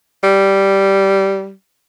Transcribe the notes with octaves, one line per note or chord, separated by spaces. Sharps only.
G3